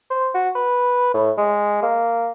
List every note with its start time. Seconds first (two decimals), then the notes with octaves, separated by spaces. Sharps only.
0.10 C5
0.35 F#4
0.55 B4
1.14 A2
1.38 G#3
1.83 A#3